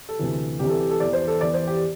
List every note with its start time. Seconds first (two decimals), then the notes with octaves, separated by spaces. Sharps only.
0.09 A4
0.19 D2 C3 E3
0.59 C2 C3 E3 G4
0.70 A4
0.80 G4
0.91 A4
1.00 E2 E3 D5
1.13 C5
1.28 A4
1.41 E2 E3 D5
1.54 C5
1.67 G4